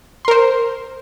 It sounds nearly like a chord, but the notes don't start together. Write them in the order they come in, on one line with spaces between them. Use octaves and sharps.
C6 A#4 C5